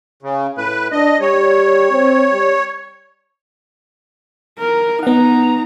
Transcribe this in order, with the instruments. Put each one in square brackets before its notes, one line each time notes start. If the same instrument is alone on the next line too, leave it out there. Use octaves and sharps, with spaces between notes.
[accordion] C#3
[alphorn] A2 [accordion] B4
[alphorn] D4 [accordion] D#5
[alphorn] G3 [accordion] C#5
[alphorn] C4
G3
[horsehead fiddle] A#4
[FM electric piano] B3 F#5 [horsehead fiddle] D#4 A#5